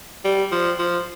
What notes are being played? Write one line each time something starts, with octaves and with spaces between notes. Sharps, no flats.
G3
F3
F3